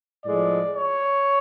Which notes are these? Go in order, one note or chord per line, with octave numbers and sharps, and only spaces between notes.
A2 F3 G#3 D5
C#5